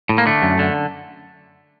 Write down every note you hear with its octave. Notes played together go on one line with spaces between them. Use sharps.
A2
A#3
D3 A3
F#2
D3